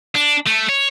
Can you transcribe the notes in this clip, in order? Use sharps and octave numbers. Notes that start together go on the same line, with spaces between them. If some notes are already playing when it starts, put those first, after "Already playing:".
D4
A3
C#5